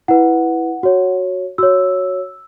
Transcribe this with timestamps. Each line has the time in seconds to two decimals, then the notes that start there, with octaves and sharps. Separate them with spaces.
0.08 E4 B4 F#5
0.83 F#4 C#5
1.58 F#4 C#5 E6